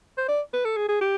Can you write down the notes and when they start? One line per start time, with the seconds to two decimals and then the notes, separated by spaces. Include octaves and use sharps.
0.17 C5
0.28 D5
0.53 B4
0.65 A4
0.77 G#4
0.88 G#4
1.01 G4